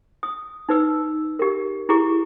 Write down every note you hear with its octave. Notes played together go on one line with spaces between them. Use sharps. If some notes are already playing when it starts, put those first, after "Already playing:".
D#6
D#4 B4 E6
G4 A#4
E4 G4 G#4 A#5 C#6 D6